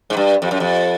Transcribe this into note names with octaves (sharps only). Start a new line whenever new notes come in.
G#2
G2
F2
F#2
F2